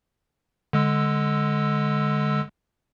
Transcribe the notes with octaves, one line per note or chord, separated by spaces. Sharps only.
D3 G#3 E6